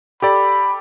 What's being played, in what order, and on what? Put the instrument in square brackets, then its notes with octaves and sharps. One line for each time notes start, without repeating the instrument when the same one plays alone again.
[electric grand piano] G4 A4 D5 [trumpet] B5